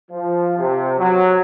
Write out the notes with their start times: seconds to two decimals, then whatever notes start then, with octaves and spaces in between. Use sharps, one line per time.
0.11 F3
0.57 C3
0.98 F#3